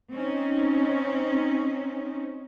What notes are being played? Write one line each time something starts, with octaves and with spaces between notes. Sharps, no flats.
C4 C#4 D#4